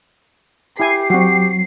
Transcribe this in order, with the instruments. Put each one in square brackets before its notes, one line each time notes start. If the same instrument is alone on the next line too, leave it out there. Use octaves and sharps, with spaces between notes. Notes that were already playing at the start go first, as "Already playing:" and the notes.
[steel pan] E4 G#5 [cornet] G4 [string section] C7
[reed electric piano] F#3 [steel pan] C4 F#4